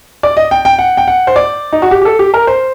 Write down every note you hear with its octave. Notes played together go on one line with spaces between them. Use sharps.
D5
D#5
G5
G5
F#5
G5
F#5
C5
D5
D#4
F#4
G4
G4
A4
G4
A#4
C5